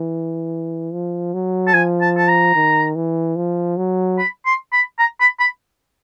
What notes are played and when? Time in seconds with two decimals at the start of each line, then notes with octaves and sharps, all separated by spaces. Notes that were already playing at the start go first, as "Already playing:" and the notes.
Already playing: E3
0.93 F3
1.34 F#3
1.67 A5
1.73 F3 G#5
2.01 A5
2.17 A5
2.28 A#5
2.56 D#3
2.96 E3
3.36 F3
3.77 F#3
4.19 B5
4.46 C6
4.73 B5
4.99 A#5
5.21 B5
5.40 B5